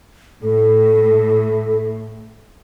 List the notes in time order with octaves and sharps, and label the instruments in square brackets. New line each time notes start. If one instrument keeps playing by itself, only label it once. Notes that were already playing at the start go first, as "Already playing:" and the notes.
[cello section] A2 [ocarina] A4